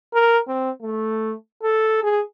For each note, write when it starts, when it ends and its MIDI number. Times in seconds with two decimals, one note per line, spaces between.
0.14 0.38 70
0.47 0.70 60
0.82 1.34 57
1.63 1.99 69
2.03 2.21 68